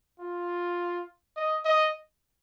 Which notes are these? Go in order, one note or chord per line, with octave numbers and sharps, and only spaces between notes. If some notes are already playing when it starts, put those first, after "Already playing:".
F4
D#5
D#5